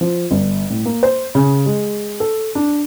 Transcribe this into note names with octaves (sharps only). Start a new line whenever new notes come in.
F3
G1
A2
A#3
C5
C#3
G#3
A4
D4